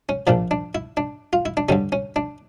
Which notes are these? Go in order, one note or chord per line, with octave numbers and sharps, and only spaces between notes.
C#4
A#1 A#2 F3 D4
D4
E4
D4
F4
E4
D4
G2 D3 G3 C#4
C#4
D4